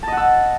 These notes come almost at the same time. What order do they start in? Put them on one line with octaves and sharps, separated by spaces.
A5 D#5 F#5 E6